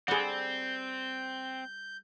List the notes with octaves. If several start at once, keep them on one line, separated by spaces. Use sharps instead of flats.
G3 C4 G#4 A4 F#5 G6